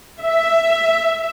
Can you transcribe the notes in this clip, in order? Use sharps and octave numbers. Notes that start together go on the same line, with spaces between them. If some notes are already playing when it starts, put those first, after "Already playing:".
E5